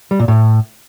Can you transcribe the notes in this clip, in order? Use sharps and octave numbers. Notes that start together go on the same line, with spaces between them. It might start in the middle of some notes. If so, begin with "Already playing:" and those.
G3
A#2
A2